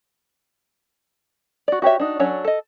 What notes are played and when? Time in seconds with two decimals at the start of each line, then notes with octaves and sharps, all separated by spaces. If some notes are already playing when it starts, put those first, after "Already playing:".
1.68 F#4 D5
1.82 F#4 G4 C#5 E5
2.00 D4 D#4 F#4
2.19 F#3 C#4 D4 A4 C#5
2.45 A4 D#5